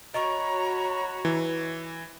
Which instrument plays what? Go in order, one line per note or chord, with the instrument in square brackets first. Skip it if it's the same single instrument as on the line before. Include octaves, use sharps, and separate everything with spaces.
[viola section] F#4 C#5 B5 [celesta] D#5 C#6 [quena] A#5
[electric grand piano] E3